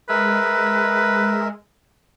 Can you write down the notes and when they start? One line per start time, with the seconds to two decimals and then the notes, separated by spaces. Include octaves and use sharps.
0.09 G#3 A#4 B4 E5